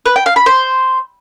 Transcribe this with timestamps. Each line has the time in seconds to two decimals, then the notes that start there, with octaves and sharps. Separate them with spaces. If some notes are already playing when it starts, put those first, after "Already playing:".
0.06 B4
0.16 G5
0.26 F5
0.36 B5
0.46 C5